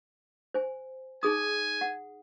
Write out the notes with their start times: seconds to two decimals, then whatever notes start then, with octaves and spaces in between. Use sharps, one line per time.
0.54 C5 G#5
1.23 D#4 G#4 G#5 D#6
1.81 F#5